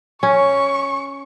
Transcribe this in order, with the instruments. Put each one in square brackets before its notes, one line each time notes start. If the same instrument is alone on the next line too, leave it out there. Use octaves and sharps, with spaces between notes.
[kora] C#4 [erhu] C#6